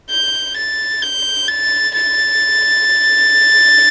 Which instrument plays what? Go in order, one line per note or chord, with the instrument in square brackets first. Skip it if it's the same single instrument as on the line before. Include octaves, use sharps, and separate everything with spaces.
[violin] G6
A6
G6
A6
A6